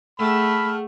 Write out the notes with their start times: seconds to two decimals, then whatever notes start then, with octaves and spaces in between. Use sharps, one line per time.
0.19 A3 G#4 F#5 G5 A5 B5 E6 F6